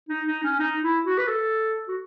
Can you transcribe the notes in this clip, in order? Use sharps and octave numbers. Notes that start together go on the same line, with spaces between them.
D#4
D#4
C#4
D#4
E4
F#4
B4
A4
F#4